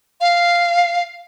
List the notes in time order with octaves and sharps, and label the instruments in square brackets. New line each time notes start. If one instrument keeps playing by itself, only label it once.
[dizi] F5